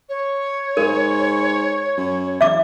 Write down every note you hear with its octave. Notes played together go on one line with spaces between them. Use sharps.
C#5
G#2 A#4
F#2
E2 E5 D6